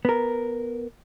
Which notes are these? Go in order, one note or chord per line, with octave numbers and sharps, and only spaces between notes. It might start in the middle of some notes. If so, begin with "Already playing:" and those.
B3 A#4